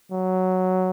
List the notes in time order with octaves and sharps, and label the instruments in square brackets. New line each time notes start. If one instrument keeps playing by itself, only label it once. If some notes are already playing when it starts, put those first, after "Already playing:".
[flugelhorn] F#3